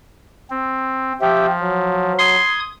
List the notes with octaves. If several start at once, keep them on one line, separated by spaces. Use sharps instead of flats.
C4
F3 G4 E5 G5
F#3
C6 D#6 G#6